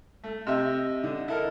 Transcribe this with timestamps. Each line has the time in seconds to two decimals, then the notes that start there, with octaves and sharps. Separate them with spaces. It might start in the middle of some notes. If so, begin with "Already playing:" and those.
0.24 A3
0.46 C3 D#5 E5
1.03 D3
1.28 E4 A4 A#4